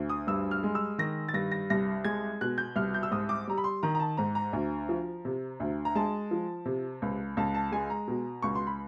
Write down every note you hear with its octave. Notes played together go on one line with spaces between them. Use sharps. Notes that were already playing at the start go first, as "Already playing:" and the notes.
Already playing: D2
D#6
G2 E6
F6
G#3
E6
D#3 A#6
A6
G2 A#6
A#6
C2 A#6
G#3 G#6
B2 F#6
G6
C2 F6
G6
E6
G#2 D#6
D6
G3 A#5
B5
C6
D#3 A#5
A#5
A5
G#2 A#5
A#5
D2
F3
C3
D2
A#5
G#3 A5
F3
C3
C#2
C#2 A5
A5
G#3 G#5
A#5
B2
C#2 C#6
C6
B5